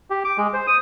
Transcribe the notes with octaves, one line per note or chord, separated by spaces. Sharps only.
G4
D6
G#3
C5
D#6